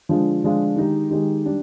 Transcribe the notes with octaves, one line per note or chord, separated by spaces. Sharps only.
D3 F3 G#3 D4 F4
D3 F3 G#3 D4 F4
D#3 G#3 D#4 G4
D#3 G#3 D#4 G4
G3 D4 G4